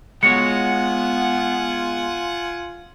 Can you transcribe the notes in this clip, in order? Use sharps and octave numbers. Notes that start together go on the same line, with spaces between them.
G#3 B3 F4 F#4 C#5 F#5 G#5 C#7